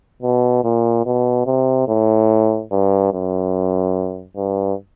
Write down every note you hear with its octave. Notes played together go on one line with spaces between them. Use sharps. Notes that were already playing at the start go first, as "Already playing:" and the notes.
B2
A#2
B2
C3
A2
G2
F#2
G2